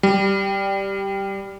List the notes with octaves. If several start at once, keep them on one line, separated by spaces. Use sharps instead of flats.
G3